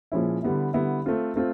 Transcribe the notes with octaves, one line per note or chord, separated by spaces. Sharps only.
A#2 F3 G#3 C#4 E4
D3 G3 B3 E4
D3 G3 B3 E4
A3 C4 F4
A3 C4 F4